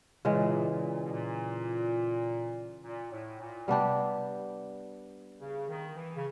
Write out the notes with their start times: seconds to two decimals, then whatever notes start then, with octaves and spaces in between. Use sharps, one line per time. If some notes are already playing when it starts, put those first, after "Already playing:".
0.25 A#2 C#3 E3 G#3
0.68 A#2
1.04 B2
1.10 A#2
2.83 A#2
3.11 A2
3.39 A#2
3.68 C3 G3 B3 D4 G4
5.39 C#3
5.68 D#3
5.95 E3
6.14 C#3